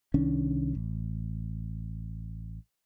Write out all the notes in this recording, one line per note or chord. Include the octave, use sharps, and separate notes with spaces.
C2 D#3 C#4 D4
A1